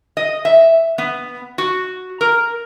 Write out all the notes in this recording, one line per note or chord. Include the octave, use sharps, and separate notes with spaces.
D#5
E5
B3
F#4
A#4